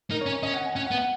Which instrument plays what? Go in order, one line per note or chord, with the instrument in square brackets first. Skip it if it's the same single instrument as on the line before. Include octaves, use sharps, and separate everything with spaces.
[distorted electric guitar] D#4 [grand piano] A#4
[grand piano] C#5
[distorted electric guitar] C#4
[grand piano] C#5
[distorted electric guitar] C#4 [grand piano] D#5
[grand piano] F#5
G#5
[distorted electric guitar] C#4 [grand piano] F#5
[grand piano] F#5
[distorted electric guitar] B3
[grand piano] F#5